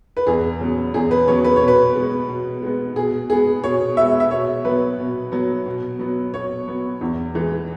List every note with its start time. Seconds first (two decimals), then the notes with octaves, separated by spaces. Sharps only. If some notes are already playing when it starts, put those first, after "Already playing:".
0.17 B4
0.27 E2 G#4
0.61 C#3 F#3 B3
0.94 E2 G#4
1.11 B4
1.28 C#3 F#3 B3 C#5
1.44 B4
1.56 B2 C#5
1.68 B4
1.95 G#3 B3
2.28 B2
2.62 G#3 B3
2.96 B2 G#4
3.30 G#3 B3 G#4
3.64 B2 C#5
3.97 G#3 B3 E5
4.20 E5
4.31 B2 C#5
4.65 F#3 B3 B4
4.99 B2
5.32 F#3 B3
5.66 B2
5.99 F#3 B3
6.33 B2 C#5
6.68 F#3 B3
7.01 E2
7.35 E3 G#3